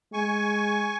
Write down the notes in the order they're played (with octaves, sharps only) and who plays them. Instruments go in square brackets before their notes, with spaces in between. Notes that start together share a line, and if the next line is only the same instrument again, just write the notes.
[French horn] G#3 [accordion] G#5 C#6